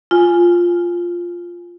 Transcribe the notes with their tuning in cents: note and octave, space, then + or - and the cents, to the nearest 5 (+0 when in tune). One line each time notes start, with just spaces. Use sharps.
F4 +0 G#5 +0